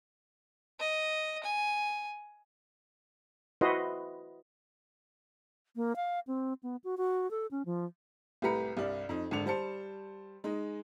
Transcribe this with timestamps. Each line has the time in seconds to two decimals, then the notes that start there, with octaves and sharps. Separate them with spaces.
0.79 D#5
1.44 G#5
3.61 E4 F#4 B4 C5 D#5
5.76 A#3
5.96 F5
6.27 C4
6.63 B3
6.84 F#4
6.97 F#4
7.31 A4
7.51 C#4
7.66 F3
8.42 C2 A2 G4 B4 A#5 C#7
8.77 C2 G2 D5
9.09 F2 D#4
9.31 G#1 D3 D4 C#7 F7
9.46 G3 C5 A5 C#7
10.44 G#3 D#4